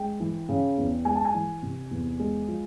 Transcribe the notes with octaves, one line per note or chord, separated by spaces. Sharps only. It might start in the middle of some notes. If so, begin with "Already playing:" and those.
Already playing: G#3 G5
E3
C#3
E2
G#3 G#5
A5
G#5
E3
C3
E2
G#3
F3